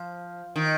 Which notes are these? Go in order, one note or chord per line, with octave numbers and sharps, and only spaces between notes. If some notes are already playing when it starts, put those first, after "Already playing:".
Already playing: F3
D#3